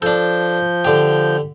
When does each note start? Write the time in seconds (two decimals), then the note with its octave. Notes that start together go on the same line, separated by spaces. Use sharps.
0.02 F3 D4 A4 G6
0.85 D3 G4